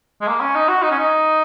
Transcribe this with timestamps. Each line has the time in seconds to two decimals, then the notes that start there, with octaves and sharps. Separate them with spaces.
0.21 G#3
0.27 A#3
0.41 C#4
0.55 D#4
0.68 F#4
0.82 D#4
0.91 C#4
0.99 D#4